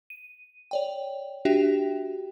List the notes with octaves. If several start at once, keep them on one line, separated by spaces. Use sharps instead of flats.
D#7
C#5 D5 G5
D4 F#4 G4 E5 G5